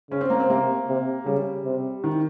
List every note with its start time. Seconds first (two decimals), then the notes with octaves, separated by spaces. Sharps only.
0.11 C#3 C#4
0.21 C4
0.30 A#3
0.40 C4
0.49 C3 A#3
0.88 C3
1.26 C#3 G3
1.65 C3
2.04 D#3